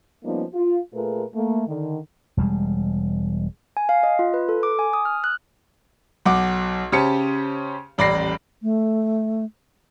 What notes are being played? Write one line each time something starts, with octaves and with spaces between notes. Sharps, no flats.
F3 G3 A#3 B3 C#4 D#4
F4
A#2 A3 F4 G#4 A#4 B4
A3 A#3
D3 D#3
E1 G3 G#3
G#5
F5
D#5
F4
B4
A4
D6
G#5
D#6
F6
F#6
B1 F#5 D6
C#3 C#4 G4 C5 A5 C#7
D#1 A1 D5 B5 A#6 C7
A3